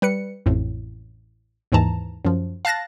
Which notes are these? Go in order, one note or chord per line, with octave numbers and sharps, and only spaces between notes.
G3 B4 C#7
A1 F2 A2
D#2 G#2 E3 A5 A#5
F#2 F3
F5 A5 F#6 A6 A#6